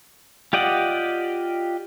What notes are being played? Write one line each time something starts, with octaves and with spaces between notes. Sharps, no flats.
F4 G4 D5 D#5 F#5